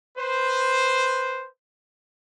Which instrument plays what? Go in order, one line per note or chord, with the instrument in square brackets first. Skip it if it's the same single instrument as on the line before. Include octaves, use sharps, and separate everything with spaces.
[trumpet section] B4 C5